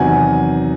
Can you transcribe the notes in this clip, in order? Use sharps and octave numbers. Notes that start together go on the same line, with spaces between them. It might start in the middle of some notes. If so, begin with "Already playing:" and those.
Already playing: E2 C3 D#3 F#3 F#5 G#5